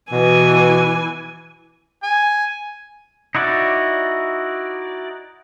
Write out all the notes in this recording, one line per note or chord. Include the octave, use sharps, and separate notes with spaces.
B2 E3 G#5
G#5
D#4 E4 F#4 D5